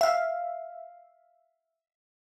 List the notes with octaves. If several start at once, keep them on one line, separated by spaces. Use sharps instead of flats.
E5 F5